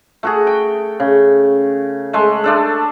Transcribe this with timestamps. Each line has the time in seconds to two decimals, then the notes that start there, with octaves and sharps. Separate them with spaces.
0.23 A3 F#4 G#4
0.47 G5
1.00 C#3
2.13 G#3 A3
2.44 A3 D4 A4